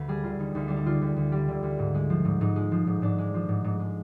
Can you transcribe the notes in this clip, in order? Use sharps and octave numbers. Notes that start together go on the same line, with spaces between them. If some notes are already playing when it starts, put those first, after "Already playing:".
Already playing: D2 B4
G3 G#4
D3 F4
D2 D#4
D2 D#4
G3 D4
D#4
D3 F4
D2
D2
G3
D3
D2
G#2
G#3
F3
G#2
G#2 D#4
G#3
F3
G#2
G#2 D4
G#3
F3
G#2
G#2
G#3